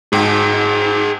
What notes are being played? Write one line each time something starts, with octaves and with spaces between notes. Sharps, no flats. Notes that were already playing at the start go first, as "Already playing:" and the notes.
G#2 G#4 G5